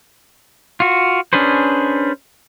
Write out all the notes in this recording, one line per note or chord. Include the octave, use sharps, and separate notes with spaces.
F4 F#4
C#4 D4 G#4 B4 C5